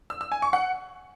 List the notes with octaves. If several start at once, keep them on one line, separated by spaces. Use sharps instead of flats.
E6
E6
G#5
C#6
F#5